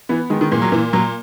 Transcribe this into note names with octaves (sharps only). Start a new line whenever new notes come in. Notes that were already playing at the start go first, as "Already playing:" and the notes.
E3 B3
D#3 G#3
D#3
A#2 E3
F#3
A#2 E3
A#2 F#3